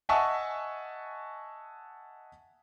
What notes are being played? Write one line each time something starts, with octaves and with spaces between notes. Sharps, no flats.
D#5 E5 F#5 G#5 A5 C#6